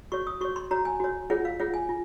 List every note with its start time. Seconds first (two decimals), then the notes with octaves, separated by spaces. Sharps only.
0.12 F#4 C#5 C#6
0.27 D#6
0.41 F#4 C#5 C#6
0.56 C6
0.71 F#4 C#5 A#5
0.85 G#5
1.00 F#4 C#5
1.30 F4 G#4 C#5 F#5
1.45 F5
1.59 F4 G#4 C#5 F#5
1.74 G#5
1.89 F4